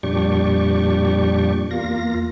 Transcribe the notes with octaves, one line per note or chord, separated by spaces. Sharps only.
F2 A#2 G3 D4 G4 C#6
E2 A#3 F4 A#6